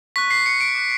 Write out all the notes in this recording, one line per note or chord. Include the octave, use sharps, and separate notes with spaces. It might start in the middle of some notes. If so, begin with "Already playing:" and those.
C#6 F#6 B6
C7
C#7
D7
D6 F#6